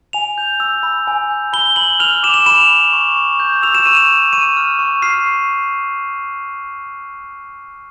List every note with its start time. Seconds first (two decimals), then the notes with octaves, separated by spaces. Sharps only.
0.13 G#5 F7
0.38 G6
0.60 E6
0.83 B5
1.07 G#5
1.30 G6
1.53 B5 G7
1.76 B5 F#7
2.00 F6 F7
2.23 D6 E7
2.34 F7
2.46 B5 E7
2.70 B5
2.93 C#6
3.16 C#6
3.40 G6
3.63 E6 F7
3.75 E7
3.86 C#6 D#7
3.97 E7
4.09 C#6
4.33 C#6 D#7
4.57 F6
4.79 C#6
5.02 F6 C7
5.26 C#6